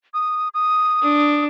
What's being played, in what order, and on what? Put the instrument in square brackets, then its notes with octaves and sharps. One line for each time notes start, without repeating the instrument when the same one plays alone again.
[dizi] D#6
D#6
[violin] D4